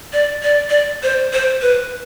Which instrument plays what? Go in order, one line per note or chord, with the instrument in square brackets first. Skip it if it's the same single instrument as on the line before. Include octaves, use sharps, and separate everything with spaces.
[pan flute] D5
D5
D5
C5
C5
B4